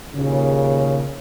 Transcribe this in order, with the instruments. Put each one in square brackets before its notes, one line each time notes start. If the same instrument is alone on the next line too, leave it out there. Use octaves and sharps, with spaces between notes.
[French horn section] D#2 A#2 C#3